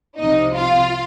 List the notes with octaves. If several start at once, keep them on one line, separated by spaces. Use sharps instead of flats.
C2 C3 F3 D#4 D#5
F4 F5